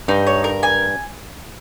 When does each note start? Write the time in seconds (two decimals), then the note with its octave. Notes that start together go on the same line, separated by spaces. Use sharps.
0.08 G2 D#4
0.27 C#5
0.44 A#4
0.63 G#5